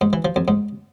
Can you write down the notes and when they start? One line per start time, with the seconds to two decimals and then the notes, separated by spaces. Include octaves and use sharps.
0.01 G#2
0.13 E3
0.25 F3
0.36 F2
0.48 G#2